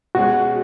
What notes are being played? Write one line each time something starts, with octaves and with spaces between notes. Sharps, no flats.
B2 G#3 C#4 F#4 G#4